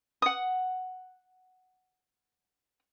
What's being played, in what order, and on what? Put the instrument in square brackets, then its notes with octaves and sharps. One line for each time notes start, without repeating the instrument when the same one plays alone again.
[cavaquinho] F#5 D#6